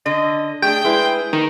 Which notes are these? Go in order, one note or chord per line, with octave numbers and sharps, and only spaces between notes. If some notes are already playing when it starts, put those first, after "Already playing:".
D3 D#5
A3 D4 G#4 G5
G#3 E4 B4
D#3 A#3